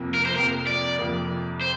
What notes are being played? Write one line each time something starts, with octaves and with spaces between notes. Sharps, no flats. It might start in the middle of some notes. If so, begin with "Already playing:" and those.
Already playing: F2 C3 F3 A#3
A#4
C5
F2 C3 F3 A#3 A#4
D5
F2 C3 F3 A#3
C5